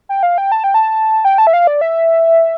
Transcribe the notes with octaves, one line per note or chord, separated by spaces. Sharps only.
G5
F5
G5
A5
G5
A5
G5
A5
E5
F5
D5
E5